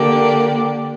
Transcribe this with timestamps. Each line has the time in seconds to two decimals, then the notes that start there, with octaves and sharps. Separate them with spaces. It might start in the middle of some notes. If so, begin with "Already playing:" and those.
Already playing: D3 A#3 G4 D5